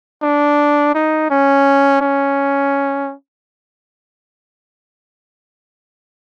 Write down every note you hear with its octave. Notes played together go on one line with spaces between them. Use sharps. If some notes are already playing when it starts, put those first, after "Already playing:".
D4
D#4
C#4
C#4